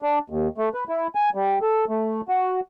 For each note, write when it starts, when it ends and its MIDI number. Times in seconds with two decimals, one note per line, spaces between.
0.02 0.19 62
0.30 0.48 39
0.58 0.69 57
0.74 0.84 71
0.89 1.07 64
1.15 1.29 80
1.35 1.59 55
1.62 1.85 69
1.89 2.21 57
2.28 2.60 66